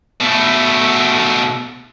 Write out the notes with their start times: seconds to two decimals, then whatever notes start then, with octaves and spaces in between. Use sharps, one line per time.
0.21 B2 A3